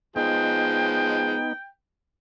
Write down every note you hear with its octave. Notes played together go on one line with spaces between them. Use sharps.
F3 G#3 B3 D#4 G5